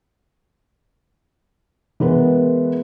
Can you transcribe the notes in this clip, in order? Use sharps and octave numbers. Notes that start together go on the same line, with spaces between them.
E3 G#3 B3 A#4 B4